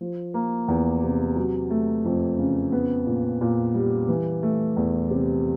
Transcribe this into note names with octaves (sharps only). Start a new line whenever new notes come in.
F3
A#3
E2
C3
F#3
A3
F2
C#3
B3
A#2
A#2
G3
E3
A3
E2
C3